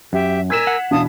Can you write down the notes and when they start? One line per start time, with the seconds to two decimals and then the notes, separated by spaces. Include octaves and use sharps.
0.13 F#2 G4 E5
0.50 A#4 G#5 E6 G#6 B6 E7
0.67 F#5
0.91 E2 B2 D4 F5 A5 D#6